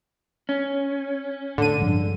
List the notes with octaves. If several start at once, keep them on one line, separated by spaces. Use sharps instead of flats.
C#4
A2 D3 D#7
G2 F3 G#3